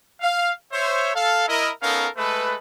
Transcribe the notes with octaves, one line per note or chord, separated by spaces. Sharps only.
F5
C5 C#5 E5
A4 F5
E4 A#4 D#5
B3 C#4 D#4 A4 A#4 F5
G#3 A3 A4 B4